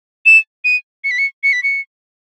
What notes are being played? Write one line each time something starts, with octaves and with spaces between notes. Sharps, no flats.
E7
D#7
C#7
B6
C#7
C#7
B6
C#7